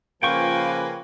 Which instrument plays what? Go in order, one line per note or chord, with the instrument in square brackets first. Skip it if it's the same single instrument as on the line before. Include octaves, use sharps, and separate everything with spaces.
[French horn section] C#3 F3 [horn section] A#3 B4 G#5 [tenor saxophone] F4 [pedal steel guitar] G5 C#6